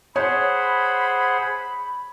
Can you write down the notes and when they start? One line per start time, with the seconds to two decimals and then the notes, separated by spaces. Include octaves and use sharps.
0.16 G#4 C5 C#5 F#5 B5